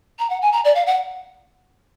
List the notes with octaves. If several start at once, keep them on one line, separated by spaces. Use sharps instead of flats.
A#5
F#5
G#5
A#5
D5
F5
F#5